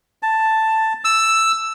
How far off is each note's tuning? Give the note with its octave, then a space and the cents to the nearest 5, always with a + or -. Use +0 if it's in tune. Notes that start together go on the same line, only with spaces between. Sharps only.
A5 +5
E6 +5